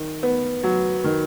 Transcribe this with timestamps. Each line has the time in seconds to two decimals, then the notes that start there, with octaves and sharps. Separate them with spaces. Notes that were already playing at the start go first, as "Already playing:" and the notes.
Already playing: D#3
0.23 B3
0.63 F#3
1.04 D#3